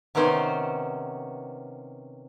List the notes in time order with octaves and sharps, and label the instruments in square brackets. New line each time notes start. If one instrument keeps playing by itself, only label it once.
[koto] C3 D#3 B3 C#4 C5